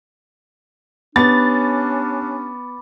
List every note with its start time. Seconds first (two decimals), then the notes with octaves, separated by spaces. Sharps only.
1.16 B3 C#4 D4 G4 B5 D6 A6